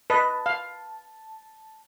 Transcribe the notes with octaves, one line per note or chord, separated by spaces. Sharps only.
B4 D#5 A5
F5